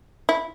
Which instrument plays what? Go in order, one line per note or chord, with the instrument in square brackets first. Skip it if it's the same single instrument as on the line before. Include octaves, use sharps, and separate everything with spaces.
[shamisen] E4